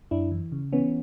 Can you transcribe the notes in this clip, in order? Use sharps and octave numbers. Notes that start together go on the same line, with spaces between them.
F#2 D4 E4
E3
C#3
E3 B3 C#4